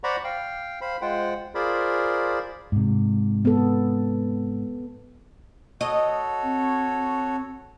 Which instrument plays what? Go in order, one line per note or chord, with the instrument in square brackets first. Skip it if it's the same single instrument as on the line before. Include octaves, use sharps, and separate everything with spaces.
[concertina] C5 D5 F#5 A#5 B5 C#6
F5 G5
C5 F5 B5
G#3 F4 C5 F#5 G5
F4 G#4 A#4 C5 D5 B5
[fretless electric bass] G#2 C3
[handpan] B3 A4
[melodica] F#4 A4 C#5 [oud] D#5
[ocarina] C4